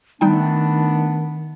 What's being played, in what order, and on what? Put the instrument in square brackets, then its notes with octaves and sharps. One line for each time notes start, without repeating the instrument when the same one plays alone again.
[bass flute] D#3 [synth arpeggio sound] G3 D#4 G5 [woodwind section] A3 B3 D4